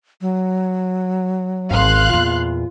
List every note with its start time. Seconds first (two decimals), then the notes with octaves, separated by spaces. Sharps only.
0.21 F#3
1.71 G#1 E2 F5 C6 F#6
2.09 E2 A#2 F4